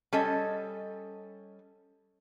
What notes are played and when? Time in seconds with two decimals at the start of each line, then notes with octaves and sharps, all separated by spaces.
0.12 G3 C#4 A4 D#5